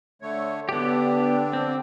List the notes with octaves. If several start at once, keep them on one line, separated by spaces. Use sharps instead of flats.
D3 A3 C#5
D3 B3 D4 G4
C4